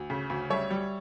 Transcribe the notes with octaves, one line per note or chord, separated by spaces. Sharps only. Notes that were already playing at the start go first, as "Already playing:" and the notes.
Already playing: D2
C#3
D2
G3 C#5 E5
G3